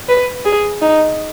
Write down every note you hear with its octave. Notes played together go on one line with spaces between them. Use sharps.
B4
G#4
D#4